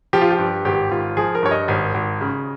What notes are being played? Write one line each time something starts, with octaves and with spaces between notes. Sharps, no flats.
F3 G4
F4
G4
G2
G#1 G4
G#1 F4
F3 G#4
A#4
G2 C#5
D#5
G#1
G#1
C#3